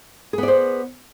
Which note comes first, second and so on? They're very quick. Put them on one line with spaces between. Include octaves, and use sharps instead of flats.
G#4 B3 D5 C5